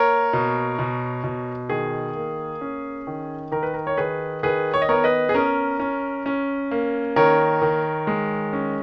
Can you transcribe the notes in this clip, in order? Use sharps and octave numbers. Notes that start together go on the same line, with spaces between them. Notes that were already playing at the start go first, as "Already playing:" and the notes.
Already playing: A#3 A#4 C#5
B2
B2
B2
D#3 G#4
A#3
C#4
D#3
D#3 A#4
B4
A#4
C#5
D#3 G#4 B4
D#3 G#4 B4
C#5
D#5
B3 A#4 C#5
B4 D#5
G#4
C#4 A#4
C#4
C#4
A#3
D#3 A#4 C#5
D#3
G#3
C#4